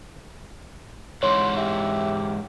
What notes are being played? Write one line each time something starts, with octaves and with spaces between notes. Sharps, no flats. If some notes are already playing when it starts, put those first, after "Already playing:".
G#2 E3 C#5 C6
G4 E5